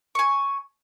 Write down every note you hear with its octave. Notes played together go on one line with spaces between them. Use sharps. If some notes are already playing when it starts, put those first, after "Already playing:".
G#5 C#6